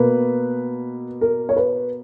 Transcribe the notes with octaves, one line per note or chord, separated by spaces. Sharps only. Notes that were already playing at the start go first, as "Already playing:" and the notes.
Already playing: B2 A#3 B4
A#4
C#5
B4